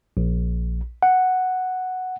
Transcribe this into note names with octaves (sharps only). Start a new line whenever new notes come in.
A#1
F#5